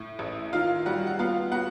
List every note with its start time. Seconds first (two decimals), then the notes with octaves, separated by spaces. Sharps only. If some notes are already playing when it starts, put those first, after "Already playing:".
Already playing: A2
0.19 A1
0.53 D#3 F4 F5
0.86 G3 F#4 F#5
1.07 F#5
1.19 B3 F4 F5
1.52 B3 F#4 F#5